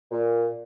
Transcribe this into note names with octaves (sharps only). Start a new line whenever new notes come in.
A#2